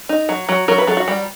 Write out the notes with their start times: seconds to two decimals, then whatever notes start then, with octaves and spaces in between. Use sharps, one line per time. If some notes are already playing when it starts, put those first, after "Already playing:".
0.09 D#4
0.29 F#3
0.49 F#3
0.68 F#3 A#4
0.78 B4
0.87 F#3 A4
0.97 F#4
1.08 G3